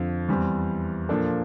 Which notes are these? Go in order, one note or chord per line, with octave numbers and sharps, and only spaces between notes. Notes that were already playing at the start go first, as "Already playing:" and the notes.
Already playing: F2 D3 F3
E2 E3 G3 C4
A#2 F3 A#3 D4 A4